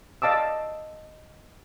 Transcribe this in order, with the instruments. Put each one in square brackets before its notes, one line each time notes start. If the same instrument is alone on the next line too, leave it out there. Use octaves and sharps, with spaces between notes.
[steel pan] D#5 F5 A5 D6 E6